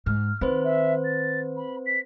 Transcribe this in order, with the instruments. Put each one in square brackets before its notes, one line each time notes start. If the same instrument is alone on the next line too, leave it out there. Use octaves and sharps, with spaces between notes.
[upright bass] G#2 [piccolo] F6
[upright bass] D#3 [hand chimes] C4 B4 C5 [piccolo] B5
[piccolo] E5
A6
B5
B6